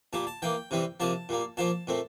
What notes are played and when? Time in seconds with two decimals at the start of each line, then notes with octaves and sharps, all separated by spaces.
0.13 A#2 G3 A#3 A5
0.27 A5
0.42 E3 A#3 G5
0.71 C3 E3 G3 C4
1.00 C3 F3 A#3 A5
1.29 A#2 G3 A#3
1.57 A#2 F3 A#3 A5
1.87 A#2 A3 C4